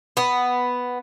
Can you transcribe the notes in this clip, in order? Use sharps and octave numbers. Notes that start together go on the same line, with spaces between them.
B3